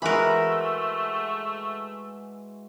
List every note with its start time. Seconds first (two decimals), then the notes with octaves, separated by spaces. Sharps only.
0.02 E3 G#3 A3 F#4 A#4 B5